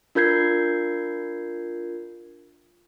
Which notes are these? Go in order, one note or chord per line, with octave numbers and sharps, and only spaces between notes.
D4 F4 A#4 G6 G#6 C7